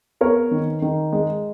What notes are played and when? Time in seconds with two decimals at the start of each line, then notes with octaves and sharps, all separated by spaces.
0.21 B3 A#4 C#5
0.51 D#3
0.82 D#3
1.13 G#3